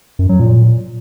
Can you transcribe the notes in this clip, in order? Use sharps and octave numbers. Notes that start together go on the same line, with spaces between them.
F#2
F#3
A#2